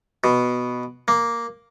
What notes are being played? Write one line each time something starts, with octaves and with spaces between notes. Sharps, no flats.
B2
A#3